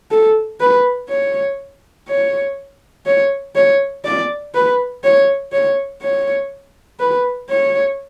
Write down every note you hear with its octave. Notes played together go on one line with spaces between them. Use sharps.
A4
B4
C#5
C#5
C#5
C#5
D5
B4
C#5
C#5
C#5
B4
C#5